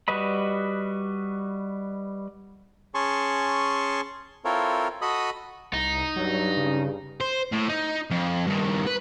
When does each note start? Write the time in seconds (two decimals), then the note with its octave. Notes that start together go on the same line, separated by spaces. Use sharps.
0.08 G3 F#4 B4 D#5 B5
2.94 C#4 G#4 A5 C6 C#6
4.45 C4 E4 F4 A4 A#4 C#5
5.02 F#4 A4 D#5 B5 D#6
5.73 C2 D#4
6.16 G2 F#3
6.57 C#3
7.20 C5
7.52 A2
7.69 D#4
8.11 F2
8.47 G2 D#3
8.87 B4